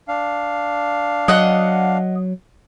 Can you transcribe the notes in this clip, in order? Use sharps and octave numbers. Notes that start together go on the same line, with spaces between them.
D4 F5
F#3 D#5 F#5